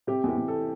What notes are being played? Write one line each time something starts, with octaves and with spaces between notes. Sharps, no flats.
C3 G4
E2 G4
E2
A4